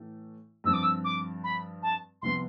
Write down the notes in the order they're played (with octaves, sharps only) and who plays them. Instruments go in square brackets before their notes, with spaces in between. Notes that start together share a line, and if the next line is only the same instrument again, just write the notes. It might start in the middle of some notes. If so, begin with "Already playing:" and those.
Already playing: [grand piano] A2 E3 A3
[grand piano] G2 F3 C4 [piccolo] E6
[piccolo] D6
E6
D6
B5
A5
[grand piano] C2 C3 F3 B3 [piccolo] C6